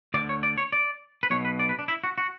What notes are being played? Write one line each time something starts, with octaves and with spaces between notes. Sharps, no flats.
D2 D3 D5
C#5
D5
C#5
D5
B4
B1 B2 C#5
B4
D5
B4
D4
E4
F#4
F#4